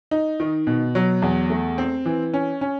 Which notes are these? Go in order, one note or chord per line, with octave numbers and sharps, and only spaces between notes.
D#4
D#3
B2
F#3
E2
A3
C4
E3
C#4
C#4